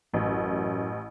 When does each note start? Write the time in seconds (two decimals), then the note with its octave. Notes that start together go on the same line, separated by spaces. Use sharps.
0.14 A1 F#2